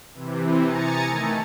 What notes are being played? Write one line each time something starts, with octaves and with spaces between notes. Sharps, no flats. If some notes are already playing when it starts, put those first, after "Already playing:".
C3 E3
G#5 A#5 D#6 A6 C#7
D#3 A3